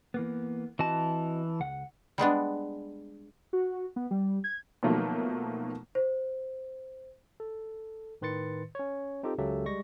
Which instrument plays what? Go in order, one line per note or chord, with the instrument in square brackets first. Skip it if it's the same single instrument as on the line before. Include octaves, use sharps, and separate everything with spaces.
[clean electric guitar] E3 A#3 B3
[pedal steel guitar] E3 A5 [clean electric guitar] C4 F#4 D#5
[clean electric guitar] C#2 F#5
[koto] G3 G#3 B3 D4
[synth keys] F#4
B3
G3
G#6
[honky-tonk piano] B2 D#3 F3 F#3 A3 A#3
[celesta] C5
[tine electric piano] A4
A2 D#3 B4 C6 A6 C#7
C#4 C#5
C4 D#4 F4 G4 A4
C#2 C#3 F#3 G4 A4 E5
G3 G#3 C#6 A#6